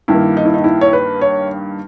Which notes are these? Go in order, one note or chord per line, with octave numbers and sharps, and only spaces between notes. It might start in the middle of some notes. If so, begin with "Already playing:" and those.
G2 D#3 A#3 E4
D#4
E4
D#4
E4
C#5
B4
C#5